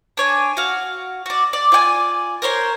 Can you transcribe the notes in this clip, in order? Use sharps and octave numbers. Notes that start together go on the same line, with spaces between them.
D4 C#5 G#5
F#4 F5
F#4 D5
D5
F4 D5 G5 G#5
A#4 C5 C#5 C6